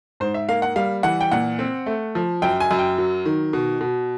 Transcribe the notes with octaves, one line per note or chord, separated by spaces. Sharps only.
G#2 C5
E5
A#3 F5
F#5
G3 F5
E3 F#5
G5
A#2 F#5
C4
A3
F3
F#2 G5
G#5
F#2
G5
F#3
D#3
B2
B2